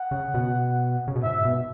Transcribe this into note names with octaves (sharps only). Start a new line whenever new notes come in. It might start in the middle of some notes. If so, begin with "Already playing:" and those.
Already playing: F#5
C#3
B2
C#3
B2
G#2 E5
B2